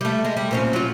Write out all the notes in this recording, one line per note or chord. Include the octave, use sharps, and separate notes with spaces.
G3 A3
G#3
G3
A#2 C4 C#4
F#3 F4